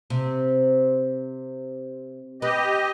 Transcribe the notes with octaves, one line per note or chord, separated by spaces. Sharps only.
C3
G4 B4 D#5